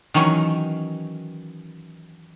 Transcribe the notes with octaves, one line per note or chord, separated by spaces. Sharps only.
D#3 E3 F#3 C#4